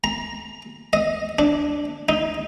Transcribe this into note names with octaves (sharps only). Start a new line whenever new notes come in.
A#5
D#5
D4
D#4